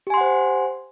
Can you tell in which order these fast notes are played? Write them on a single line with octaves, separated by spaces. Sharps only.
G4 G#5 C6 F#5 C5